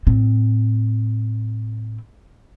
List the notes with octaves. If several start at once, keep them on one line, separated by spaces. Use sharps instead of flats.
A2 C4